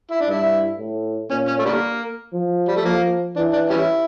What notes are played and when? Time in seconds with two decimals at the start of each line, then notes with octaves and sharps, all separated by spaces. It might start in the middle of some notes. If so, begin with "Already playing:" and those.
0.11 E4
0.20 D4
0.28 G2 E4
0.79 A2
1.30 A#2 C#4
1.48 C#4
1.59 A3
1.65 D3 G3 A#3
2.33 F3
2.68 G3
2.77 A3
2.84 F3 A#3
3.36 E3 D4
3.53 D4
3.70 G3 C#4 E4